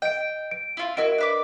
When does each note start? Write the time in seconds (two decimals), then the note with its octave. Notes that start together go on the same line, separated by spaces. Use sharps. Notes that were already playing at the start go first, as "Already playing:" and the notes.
0.02 D#5 G5 D7
0.51 D7
0.77 E4 F4
0.97 E4 F#4 A#4 D#5 D7
1.18 D4 B4 D6